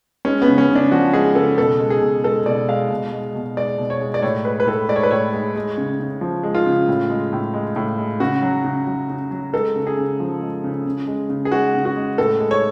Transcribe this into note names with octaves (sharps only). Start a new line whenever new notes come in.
G#3 C#4
B3
C#3
C#4
C#3
D4
F3 F#4
G#3 G#4
C#3 A4
B2 A4
G#3
G#4
B2
G#3 A4
B2 D5
G#3 F5
B2
G#3
B2
G#3 D5
B2
C#5
G#3
D5
A2 C#5
G#3 B4
B4
A2 A4
G#3 D5
C#5
B4
A2 C#5
G#3
G#3
C#3
C#3
F3
G#3
F4
C#3
A2
G#3
A2
G#3
A2
G#3
C#3 F#4
F#3
C#3
F#3
C#3
F#3
G#3 A4
C#3
G#4
C#3
F3
G#3
C#3
C#3
G#3
C#3
G#4
G#3 F#4
C#3
F#4
G#3
A2 A4
G#3
C#5